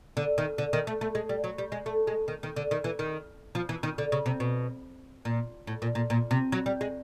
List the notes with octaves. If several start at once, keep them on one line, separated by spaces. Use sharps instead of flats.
D3
D#3
D3
D#3
A3
A3
G#3
G3
F#3
G3
G#3
A3
G#3
D#3
D#3
D3
D#3
E3
D#3
F3
E3
D#3
D3
C#3
C3
B2
A#2
A2
A#2
A#2
A#2
C3
F#3
G3
G#3